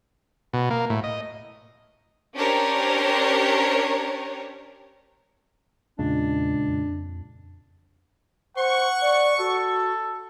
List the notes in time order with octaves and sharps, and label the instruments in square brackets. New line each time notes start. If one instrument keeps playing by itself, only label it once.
[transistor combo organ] B2
A#3
A2
D#5
[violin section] C#4 D4 G4 A#4 C5 C#5
[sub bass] E2 [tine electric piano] A#2 C#3 G#3 [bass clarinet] D4
[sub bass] F2
[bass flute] C5 [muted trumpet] F#5 [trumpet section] C#6
[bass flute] D5
[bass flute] F#4 [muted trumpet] A4